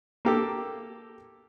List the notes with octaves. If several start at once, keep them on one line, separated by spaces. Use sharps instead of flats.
A#3 G4 A4